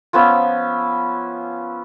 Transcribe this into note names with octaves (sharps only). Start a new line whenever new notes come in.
F3 B3 C#4 E5